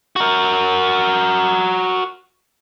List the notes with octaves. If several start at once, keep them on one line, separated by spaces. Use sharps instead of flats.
F#4 A#4